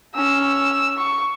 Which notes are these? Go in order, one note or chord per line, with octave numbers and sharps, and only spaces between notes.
C#4 E6
C#6